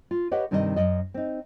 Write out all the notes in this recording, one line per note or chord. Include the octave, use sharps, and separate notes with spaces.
F4
G4 B4 C#5 D#5 F#5
G2 C3 D#3 G3 F4 D#5
F#2 D#5
C4 D#4